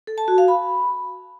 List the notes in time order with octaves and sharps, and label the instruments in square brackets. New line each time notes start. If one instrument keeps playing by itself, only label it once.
[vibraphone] A4
A5
F#4
F5
B5